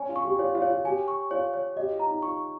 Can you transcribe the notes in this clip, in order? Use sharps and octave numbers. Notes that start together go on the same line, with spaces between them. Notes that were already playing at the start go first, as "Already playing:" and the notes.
Already playing: C#4 G#5
F4
C#6
G4
F4 C#5
F4
C#5
F4
G4 G#5
C#6
F4 C#5
C#5
G4 D#5
F4
A#5
D#4
F4 C#6